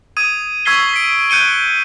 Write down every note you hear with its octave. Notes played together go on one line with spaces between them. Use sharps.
D#6 G#6 D#7
C#6 E6 G#6 B6 C7 G7
B6 D7
F#6 G6 C#7 D#7 G7